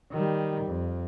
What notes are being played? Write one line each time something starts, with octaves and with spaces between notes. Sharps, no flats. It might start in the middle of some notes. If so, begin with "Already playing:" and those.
D#3 G3
F2